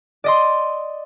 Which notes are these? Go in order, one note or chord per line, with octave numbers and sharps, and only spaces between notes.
D5 D#5 C6